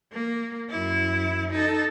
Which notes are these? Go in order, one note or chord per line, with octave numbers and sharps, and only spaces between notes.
A#3
F#2 E4
D#4 A4